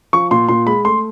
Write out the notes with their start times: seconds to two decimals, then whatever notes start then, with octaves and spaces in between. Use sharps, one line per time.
0.13 F3 C#6
0.31 A#2 C6
0.49 A#2 C6
0.66 G#3 B5
0.85 A3 C6